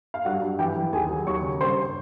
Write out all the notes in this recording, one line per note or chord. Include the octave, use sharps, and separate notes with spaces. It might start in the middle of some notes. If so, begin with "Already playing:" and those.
F5
G2 F#4 F#5
G2
E3 G4 G5
E3
D#2 G#4 G#5
F#3
D#2 C#5 C#6
C#3
G2 C5 C6